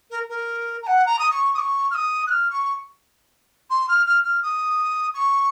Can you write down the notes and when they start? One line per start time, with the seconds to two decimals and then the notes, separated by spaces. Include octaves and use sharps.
0.10 A#4
0.29 A#4
0.82 A#5
0.86 F#5
1.06 A#5
1.19 D#6
1.30 C#6
1.54 D#6
1.58 C#6
1.90 F6
1.94 D#6
2.26 F#6
2.30 F6
2.50 C#6
3.70 C6
3.88 F6
4.06 F6
4.24 F6
4.42 D#6
5.14 C#6